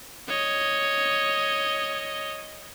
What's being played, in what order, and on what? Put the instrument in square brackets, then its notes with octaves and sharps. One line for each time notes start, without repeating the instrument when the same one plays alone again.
[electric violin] C#5 D#5